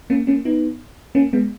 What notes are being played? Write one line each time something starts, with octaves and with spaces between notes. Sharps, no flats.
A#3 C#4
A#3 C#4
B3 D#4
A#3 C#4
G#3 B3